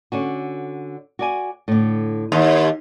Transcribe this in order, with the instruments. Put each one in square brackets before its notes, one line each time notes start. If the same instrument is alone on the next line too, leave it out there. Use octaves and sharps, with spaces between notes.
[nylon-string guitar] D3 C#4 F#4
F#4 D5 G#5
A2 D3
[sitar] D#2 [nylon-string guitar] D#5